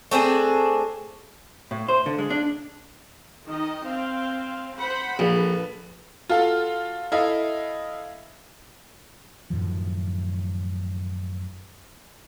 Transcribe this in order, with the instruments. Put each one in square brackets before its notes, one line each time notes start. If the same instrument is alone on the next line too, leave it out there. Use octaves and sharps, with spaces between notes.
[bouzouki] A3 C4 D4 G#4
[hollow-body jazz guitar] A2
C5
D3
G#3
D4
[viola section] D#3 D#5
C4 F5
C5 F#5 B5
[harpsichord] A#1 [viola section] A4 B4
[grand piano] F4 F#4 A4 F5
E4 A4 D#5 F5
[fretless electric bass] F#2 A2 D#3 F3